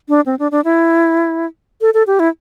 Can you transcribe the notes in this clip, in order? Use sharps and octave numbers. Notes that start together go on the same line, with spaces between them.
D4
C4
D4
D4
E4
A4
A4
G4
E4